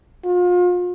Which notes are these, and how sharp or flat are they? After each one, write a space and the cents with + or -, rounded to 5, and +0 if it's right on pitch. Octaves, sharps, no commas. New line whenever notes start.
F4 +35